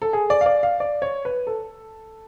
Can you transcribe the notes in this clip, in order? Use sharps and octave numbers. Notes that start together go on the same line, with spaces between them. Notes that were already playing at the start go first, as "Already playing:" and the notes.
A4
G#4
D5
F5
D5
F5
D5
C#5
B4
A4